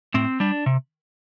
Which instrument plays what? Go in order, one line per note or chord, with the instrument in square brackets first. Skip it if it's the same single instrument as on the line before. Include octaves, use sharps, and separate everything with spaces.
[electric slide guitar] A2 C4
G3 D4
C3